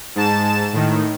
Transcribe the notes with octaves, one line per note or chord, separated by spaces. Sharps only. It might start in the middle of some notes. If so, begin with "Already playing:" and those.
G#2 A5 E7
A2 D#3